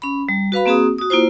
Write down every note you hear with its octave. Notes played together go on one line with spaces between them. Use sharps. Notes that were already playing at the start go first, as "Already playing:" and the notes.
C#4 B5
G3
F#4 B4 F5 B5
A#3 C4 F#4 G#4 D#6
F#4 D#6
A#3 E4 F4 C5